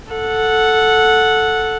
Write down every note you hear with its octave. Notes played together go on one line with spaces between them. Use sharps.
A4 F#5